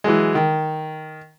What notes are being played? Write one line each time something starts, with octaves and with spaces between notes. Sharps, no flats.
E3 F#3 G#3
D#3